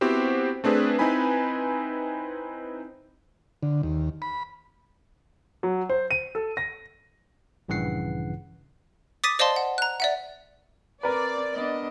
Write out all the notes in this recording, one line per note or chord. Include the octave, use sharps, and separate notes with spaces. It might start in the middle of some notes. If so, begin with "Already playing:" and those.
B3 C4 E4 F#4 G4 C5
A3 C4 D4 G#4 B4
C4 D#4 E4 B4 G#5 B5
D3
D#2
B5
F#3
C5
D#7
A4
A#6
A#1 G2 C#3 E3 F#5 C7
D6 D#6 A6 B6 D#7
C5 D5 D#5 F5 A5 C6
F#5
A#5 F#6
D5 E5 F#5
C4 A#4 B4 D5
B3 D4 D#5